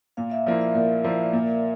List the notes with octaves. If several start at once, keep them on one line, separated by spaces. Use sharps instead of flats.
A#2 F5
E5
F3 A#3 E4 D5
E5
A#2 A#4
F3 A#3 E4
A#2